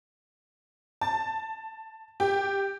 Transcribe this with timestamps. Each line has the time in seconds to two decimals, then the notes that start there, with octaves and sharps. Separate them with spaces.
1.01 A5
2.20 G4